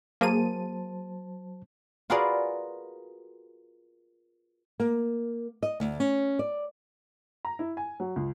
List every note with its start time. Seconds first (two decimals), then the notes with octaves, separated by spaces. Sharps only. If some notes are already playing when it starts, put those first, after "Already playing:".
0.21 F#3 A#3 G#4 C5 A5 D#7
2.10 F4 F#4 G#4 A#4 B4 D5
4.80 A#3
5.63 D#5
5.80 D2
6.00 C#4
6.39 D5
7.45 A#5
7.59 E4
7.77 G#5
8.00 F#3
8.16 C#2